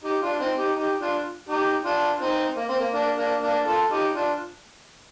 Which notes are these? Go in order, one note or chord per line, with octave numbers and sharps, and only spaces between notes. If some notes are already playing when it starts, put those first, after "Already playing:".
D#4 G4
D4 F4
C4 D#4
D#4 G4
D#4 G4
D4 F4
D#4 G4
D4 F4
C4 D#4
A#3
C4
A#3
A#3 D4
A#3 D4
A#3 D4
F4 A4
D#4 G4
D4 F4